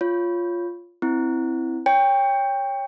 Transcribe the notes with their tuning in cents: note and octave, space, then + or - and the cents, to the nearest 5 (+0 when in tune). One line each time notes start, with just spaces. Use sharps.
F4 +0 C#5 +0
C4 +0 E4 +0
C#5 +0 G5 +20